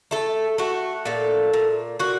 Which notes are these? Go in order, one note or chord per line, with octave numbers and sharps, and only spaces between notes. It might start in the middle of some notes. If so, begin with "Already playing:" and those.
A3 A4
A3 F#4
A#2 A4
A#2
A#2 F#4